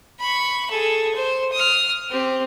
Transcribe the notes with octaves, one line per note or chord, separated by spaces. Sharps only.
B5 C#6
G#4 A4
C5
D#6 F6
C4 G4